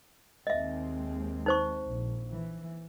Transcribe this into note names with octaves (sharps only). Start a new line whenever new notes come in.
D#2 G#3 C4 D#5 E5
D#4 C5 C#6
A#1
E3